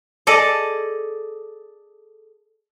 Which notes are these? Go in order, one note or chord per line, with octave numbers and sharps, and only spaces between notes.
G#4 A4 D5 D#5